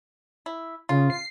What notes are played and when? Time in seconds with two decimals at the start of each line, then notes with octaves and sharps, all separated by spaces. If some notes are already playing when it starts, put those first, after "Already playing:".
0.46 E4
0.89 C#3 F4
1.10 C7